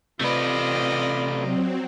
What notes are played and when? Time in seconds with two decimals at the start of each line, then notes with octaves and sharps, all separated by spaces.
0.20 C3 A3 F4 B4 D5 D#5
1.32 F#3 C4